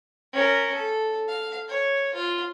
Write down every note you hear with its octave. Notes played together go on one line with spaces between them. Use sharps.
C#4 A#4
A4
F5
C#5
F4